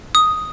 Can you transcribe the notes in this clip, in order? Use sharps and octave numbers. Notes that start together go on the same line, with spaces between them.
D#6